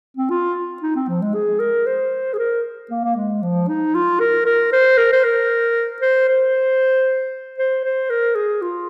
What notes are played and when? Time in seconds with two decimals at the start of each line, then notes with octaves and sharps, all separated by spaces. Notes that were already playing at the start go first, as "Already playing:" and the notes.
0.17 C4
0.30 F4
0.82 D#4
0.95 C4
1.08 F3
1.22 G#3
1.34 G#4
1.60 A#4
1.86 C5
2.33 G#4
2.38 A#4
2.91 A#3
3.04 A#3
3.16 G#3
3.43 F3
3.69 D#4
3.95 F4
4.20 A#4
4.45 A#4
4.72 C5
4.97 A#4
5.13 C5
5.24 A#4
6.02 C5
6.28 C5
7.58 C5
7.84 C5
8.10 A#4
8.35 G#4
8.62 F4